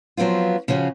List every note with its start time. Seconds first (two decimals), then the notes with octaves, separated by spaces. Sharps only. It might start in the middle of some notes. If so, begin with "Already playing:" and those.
0.17 F3 F#3 B3 C4 F4
0.68 C#3 F3 C#4 F#4